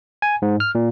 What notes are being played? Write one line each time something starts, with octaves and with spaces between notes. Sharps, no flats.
G#5
G#2
F6
A#2